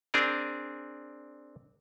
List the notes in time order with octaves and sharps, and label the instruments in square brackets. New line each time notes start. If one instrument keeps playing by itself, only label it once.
[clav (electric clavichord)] C4 D4 G#4 A#4